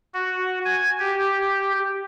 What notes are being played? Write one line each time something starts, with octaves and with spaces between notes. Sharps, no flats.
F#4
G#5
G4